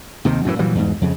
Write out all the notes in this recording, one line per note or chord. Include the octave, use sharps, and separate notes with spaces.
D#2 C3 D#3
F#2 A2 D3 E3
A#2 E3 F#3 G3
E2 G#2
F2 C#3